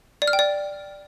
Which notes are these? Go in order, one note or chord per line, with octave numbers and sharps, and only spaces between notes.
D5
F6
G5
D5